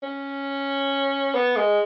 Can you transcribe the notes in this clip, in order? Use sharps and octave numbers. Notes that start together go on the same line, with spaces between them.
C#4
B3
G#3